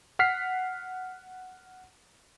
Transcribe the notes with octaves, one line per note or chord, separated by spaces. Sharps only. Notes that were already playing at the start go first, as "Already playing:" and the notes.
F#5 F6 B6 C7